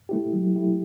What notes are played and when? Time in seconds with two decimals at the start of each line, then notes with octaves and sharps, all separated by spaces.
0.09 A3 E4 G4
0.33 F#3
0.56 A3 E4 G4